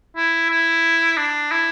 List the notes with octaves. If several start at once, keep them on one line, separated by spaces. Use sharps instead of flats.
E4
E4
D4
E4